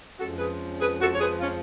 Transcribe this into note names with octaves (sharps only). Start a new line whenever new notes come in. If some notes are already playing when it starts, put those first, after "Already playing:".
F2 F3 G#3 C#4 F#4 A4
G#4 B4
G#4 B4
F#4 A4
C#5
G#4 B4
C#4 F4